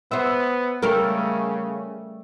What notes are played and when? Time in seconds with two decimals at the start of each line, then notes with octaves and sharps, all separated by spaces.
0.11 B3 C5 E5
0.82 C#3 G3 A3 A#4